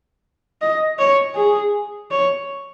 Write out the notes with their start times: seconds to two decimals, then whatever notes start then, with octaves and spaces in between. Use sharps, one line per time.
0.62 D#5
0.99 C#5
1.35 G#4
2.11 C#5